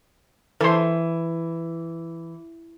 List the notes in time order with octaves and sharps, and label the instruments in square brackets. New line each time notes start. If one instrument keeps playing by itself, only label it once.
[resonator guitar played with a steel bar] E3 [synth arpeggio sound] A4 C5